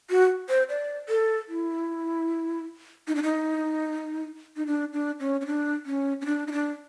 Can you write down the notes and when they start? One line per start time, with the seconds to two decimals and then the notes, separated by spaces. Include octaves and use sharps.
0.10 F#4
0.49 C5
0.69 D5
1.09 A4
1.49 E4
3.08 D#4
3.15 D4
3.23 D#4
4.57 D#4
4.67 D4
4.93 D4
5.20 C#4
5.41 C#4
5.46 D4
5.86 C#4
6.21 C#4
6.26 D4
6.47 D#4
6.52 D4